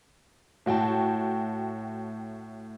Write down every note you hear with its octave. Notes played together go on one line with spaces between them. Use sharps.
A2 F#4 G5 A5